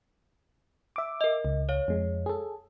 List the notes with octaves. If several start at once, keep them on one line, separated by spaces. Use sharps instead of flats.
E5 D6
A#4 D#5
C#2
C#5 F5
F2 G#3
G#4 A4